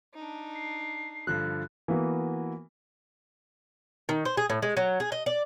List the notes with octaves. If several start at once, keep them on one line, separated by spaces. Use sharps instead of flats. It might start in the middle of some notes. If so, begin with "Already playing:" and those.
D4 D#4
C7
G2 D3 F3 F#6
E3 A#3 B3 F#4
D#3
C5
G#4
A2
G#3
F#3
G#4
D#5
D5